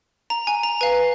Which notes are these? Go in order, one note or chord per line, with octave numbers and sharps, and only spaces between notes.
A#5
G#5
A#5
B4 F5 G#5